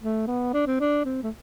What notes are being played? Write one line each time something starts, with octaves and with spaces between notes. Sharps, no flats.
A3
B3
D4
C4
D4
C4
A3